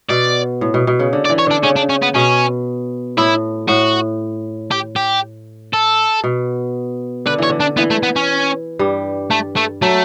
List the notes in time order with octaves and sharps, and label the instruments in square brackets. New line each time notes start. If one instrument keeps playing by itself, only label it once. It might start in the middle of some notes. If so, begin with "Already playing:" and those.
[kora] B2 [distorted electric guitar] D5
[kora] A2
B2
B2
C#3
D3
[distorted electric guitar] D5
[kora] E3
[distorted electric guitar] C#5
[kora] D3 [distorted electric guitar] D4
[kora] C#3 [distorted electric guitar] C#4
[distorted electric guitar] D4
C#4
B3
[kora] B2 [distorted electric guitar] C#4
[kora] A2 [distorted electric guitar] E4
[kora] A2 [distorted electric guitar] F#4
[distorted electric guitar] G4
G4
A4
[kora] B2
[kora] D3 [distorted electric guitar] B4
[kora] E3 [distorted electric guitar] C#5
[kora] D3
[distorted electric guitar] D4
[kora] E3 [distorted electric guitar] B3
[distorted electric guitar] A3
B3
C#4
[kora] G2 G3
[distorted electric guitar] A3
A3
[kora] F#3 [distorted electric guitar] A3